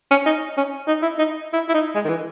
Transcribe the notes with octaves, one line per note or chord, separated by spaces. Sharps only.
C#4
D#4
C#4
D#4
E4
D#4
E4
E4
D#4
G#3
D#3
E3